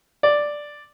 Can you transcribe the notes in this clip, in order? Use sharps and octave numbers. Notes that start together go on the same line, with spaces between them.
D5